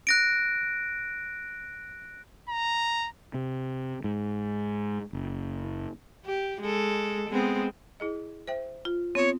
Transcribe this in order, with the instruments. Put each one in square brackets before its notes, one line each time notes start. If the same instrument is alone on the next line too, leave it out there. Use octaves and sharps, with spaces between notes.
[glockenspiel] F#6 A#6 D7
[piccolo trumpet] A#5
[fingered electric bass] C3
G#2
F#1
[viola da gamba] G4
G#3 A4
G#3 B3 C4
[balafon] E4 G#4 D#5
C5 E5 G5
[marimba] F4
[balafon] B3 F4 [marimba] C4 [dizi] C#5